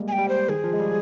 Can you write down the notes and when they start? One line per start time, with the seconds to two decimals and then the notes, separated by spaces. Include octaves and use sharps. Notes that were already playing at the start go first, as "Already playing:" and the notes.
Already playing: G3 G#3 A#3
0.08 G#5
0.12 G5
0.18 G3
0.29 C5
0.49 D#3 G#4
0.64 F3
0.73 G#3
0.80 G3